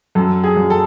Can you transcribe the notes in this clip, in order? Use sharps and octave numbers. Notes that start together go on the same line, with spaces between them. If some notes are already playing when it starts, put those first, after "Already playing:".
F#2 A4
G#4
F#2
A4